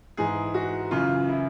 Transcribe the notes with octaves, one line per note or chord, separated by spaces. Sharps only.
G#2 E3 G#4
F#4
F#2 C#3 E3 F4
E4